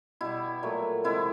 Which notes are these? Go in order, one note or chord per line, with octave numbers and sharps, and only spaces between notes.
B2 G3 E4
A#2 F#3 A3
C3 E3 G#3 E4